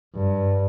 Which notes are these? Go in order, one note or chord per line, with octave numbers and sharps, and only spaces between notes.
G2